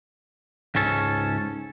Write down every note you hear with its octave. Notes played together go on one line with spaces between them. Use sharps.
C#2 G#2 C#4 A4